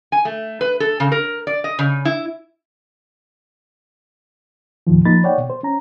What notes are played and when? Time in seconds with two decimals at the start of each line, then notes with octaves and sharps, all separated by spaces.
0.12 G#5
0.25 A3
0.61 B4
0.80 A4
1.00 C#3
1.12 A#4
1.47 D5
1.64 D#5
1.79 C#3
2.05 E4
4.87 D#2 A2 D#3 F3
5.05 F3 A#3 D#4 B5 A6
5.24 C#5 D5 F#5 G5
5.38 B2
5.50 C5
5.63 C#4 A#5